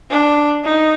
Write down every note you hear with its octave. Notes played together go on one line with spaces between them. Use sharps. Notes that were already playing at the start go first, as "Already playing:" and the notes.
D4
D#4